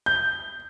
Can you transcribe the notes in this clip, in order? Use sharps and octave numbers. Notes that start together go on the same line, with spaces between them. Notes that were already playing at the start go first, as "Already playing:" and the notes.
G6